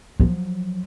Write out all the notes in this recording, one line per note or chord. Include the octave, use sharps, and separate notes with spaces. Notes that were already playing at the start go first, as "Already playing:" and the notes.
F3 F#3